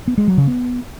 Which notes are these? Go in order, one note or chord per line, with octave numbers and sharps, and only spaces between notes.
B3
G#3
F#3
C#3
B3